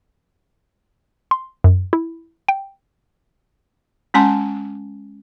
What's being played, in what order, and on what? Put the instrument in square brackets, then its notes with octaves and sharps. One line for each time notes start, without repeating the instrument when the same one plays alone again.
[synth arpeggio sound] C6
F#2
E4
G5
[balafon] G#3 C#4 G#5 A5 C6